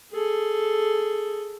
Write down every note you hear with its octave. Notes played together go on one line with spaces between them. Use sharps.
G#4 A4